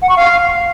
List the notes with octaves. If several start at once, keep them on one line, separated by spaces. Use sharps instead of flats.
F#5
C#6
F5